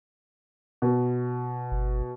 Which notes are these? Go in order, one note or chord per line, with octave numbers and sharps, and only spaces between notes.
B2
G1